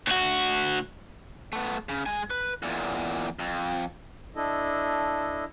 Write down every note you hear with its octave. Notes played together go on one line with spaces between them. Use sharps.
D2 F#4
A3 B3
C#3
G#3 G#5
B4
E2 A#2
F2
D4 E4 A4 D#5